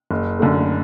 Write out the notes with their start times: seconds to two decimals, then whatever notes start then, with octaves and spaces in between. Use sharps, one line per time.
0.11 F#1
0.39 F#2 D3 A3